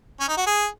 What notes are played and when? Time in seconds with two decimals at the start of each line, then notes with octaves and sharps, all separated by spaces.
0.20 C#4
0.28 D#4
0.37 F#4
0.47 G#4